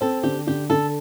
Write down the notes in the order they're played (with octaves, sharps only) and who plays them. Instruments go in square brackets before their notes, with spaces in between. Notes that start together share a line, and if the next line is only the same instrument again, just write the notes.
[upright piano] C4 [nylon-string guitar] A4
[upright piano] D3 [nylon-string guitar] G4
[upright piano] D3 [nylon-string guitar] G4
[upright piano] D3 [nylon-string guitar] A4